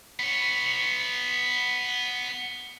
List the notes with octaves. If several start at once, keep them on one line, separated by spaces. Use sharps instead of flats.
B3 C#5